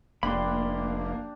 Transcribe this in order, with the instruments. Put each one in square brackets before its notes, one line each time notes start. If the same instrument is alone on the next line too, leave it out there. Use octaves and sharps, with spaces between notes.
[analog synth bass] F1 [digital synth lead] A#3 [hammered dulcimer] D4 G4 [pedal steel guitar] B5 C6